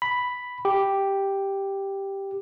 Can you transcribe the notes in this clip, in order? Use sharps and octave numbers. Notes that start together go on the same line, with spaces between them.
B5
G4